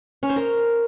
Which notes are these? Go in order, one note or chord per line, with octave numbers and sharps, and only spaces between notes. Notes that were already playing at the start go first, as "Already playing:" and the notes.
C#4
C5
A#4